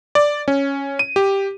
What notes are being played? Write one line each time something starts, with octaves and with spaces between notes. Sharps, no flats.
D5
C#4
D#7
G4